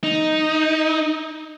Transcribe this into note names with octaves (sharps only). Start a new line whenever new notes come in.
D#4